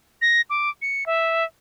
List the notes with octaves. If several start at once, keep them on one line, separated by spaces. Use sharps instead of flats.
A#6
D6
C#7
E5